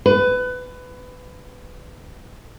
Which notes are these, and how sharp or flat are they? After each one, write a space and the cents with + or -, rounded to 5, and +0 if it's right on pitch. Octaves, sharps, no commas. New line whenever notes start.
B4 +20